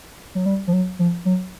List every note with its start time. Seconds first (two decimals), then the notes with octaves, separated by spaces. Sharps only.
0.35 F#3
0.46 G3
0.67 F3
0.73 F#3
0.99 F3
1.25 F#3